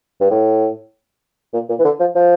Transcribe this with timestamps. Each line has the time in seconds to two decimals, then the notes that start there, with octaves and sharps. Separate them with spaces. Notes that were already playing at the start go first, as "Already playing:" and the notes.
0.21 G2
0.31 A2
1.53 A#2
1.69 A#2
1.79 E3
1.84 D3
2.00 F3
2.15 F3